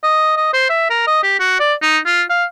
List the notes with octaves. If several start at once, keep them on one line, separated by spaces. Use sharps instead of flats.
D#5
D#5
C5
E5
A#4
D#5
G4
F#4
D5
D#4
F4
F5